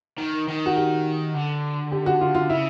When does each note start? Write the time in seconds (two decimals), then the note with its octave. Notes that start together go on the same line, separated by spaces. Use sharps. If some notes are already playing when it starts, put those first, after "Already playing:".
0.18 D#3
0.48 D#3
0.66 F#4
0.76 G4
1.34 D3
1.91 G4
2.06 F#4
2.21 F4
2.35 F4
2.49 C#3 E4